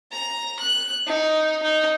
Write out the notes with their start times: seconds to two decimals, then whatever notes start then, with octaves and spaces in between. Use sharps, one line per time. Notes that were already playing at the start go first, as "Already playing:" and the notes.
0.12 A#5
0.59 F#6
1.07 D#4
1.62 D#4